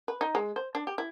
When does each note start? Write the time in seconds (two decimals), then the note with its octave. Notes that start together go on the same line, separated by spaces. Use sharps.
0.08 B4
0.21 D#4
0.35 G#3
0.56 C5
0.75 D4
0.87 G4
0.98 E4